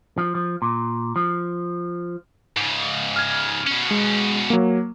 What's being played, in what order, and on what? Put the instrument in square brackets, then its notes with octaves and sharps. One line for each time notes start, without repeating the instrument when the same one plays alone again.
[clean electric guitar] F3
F3
A#2
F3
[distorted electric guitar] G#2 C#3
[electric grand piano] F6 G#6
[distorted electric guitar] B2 C#4
[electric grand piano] G#3
F#3 A#3